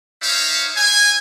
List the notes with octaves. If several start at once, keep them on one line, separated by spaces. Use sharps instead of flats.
D#4 C5 C#5 E5 F5
E4 C5 G#5